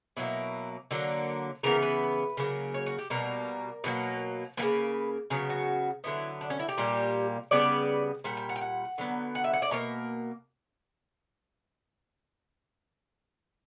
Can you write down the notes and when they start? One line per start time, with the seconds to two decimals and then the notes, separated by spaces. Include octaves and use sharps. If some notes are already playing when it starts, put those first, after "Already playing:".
0.17 B2 F#3 A#3 E4
0.91 D3 F#3 A#3
1.63 C#3 E3 B3 A#4
1.82 B4
2.37 C#3 F#3 A#3
2.74 C#5
2.86 F#4
2.98 G4
3.10 B2 G3 A#3 A#4
3.84 B2 F#3 A#3
4.57 G3 A#3 B4
4.62 C#3
5.30 C#3 F#3 B3 C#5
5.50 F#4
6.04 D3 F#3 B3 E4
6.41 D4
6.50 C#4
6.59 E4
6.68 G4
6.78 A#2 G3 A#3
7.51 C#3 G3 B3 D5
8.24 A#2 G3 F#5
8.37 G5
8.49 F#5
8.56 G5
8.61 F#5
8.98 D3 F#3 B3
9.35 F#5
9.44 E5
9.53 F#5
9.62 D5
9.71 B2 A#3 C#5